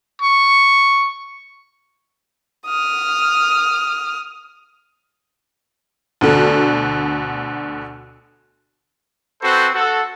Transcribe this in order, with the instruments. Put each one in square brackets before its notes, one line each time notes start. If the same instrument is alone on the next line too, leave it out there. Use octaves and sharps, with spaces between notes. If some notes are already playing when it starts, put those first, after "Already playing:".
[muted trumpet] C#6
[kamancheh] D#6 F6
[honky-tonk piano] D2 B2 D3
[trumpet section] C4 F#4 A4 B4 C5
F#4 A4